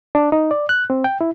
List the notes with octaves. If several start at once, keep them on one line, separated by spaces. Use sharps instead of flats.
D4
D#4
D5
F#6
C4
G5
E4